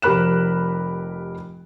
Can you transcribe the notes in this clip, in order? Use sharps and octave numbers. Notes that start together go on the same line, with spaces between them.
F1 G4 A#4 B5 F#6 E7